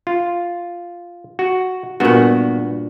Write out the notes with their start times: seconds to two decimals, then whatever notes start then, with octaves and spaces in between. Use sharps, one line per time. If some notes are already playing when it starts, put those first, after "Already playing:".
0.07 F4
1.39 F#4
2.00 G2 A#2 B3 F#4